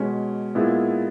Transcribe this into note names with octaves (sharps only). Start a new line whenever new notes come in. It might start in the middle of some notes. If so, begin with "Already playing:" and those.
Already playing: B2 G#3 C#4
A#2 G#3 B3 E4 G#4